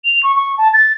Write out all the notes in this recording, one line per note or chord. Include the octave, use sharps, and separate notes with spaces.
F7
C#6
C#6
A5
A6